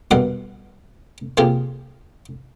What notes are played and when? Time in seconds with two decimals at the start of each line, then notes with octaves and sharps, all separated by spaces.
0.11 G2 B2 A#4 F#5 C6
1.37 C3 A#3 F4 G4 G#4